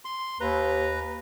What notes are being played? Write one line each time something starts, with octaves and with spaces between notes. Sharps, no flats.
C6
D#2 B4 A#5